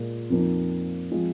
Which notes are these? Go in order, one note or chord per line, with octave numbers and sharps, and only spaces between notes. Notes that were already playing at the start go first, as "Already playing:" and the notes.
Already playing: A#2 G#3 A#4
F2 F3 A#3 D#4
F3 G#3 C4 F4